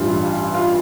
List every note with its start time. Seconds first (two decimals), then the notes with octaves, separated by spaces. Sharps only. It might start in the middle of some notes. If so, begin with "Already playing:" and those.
Already playing: A1 G2 E3 G3 F4
0.55 F4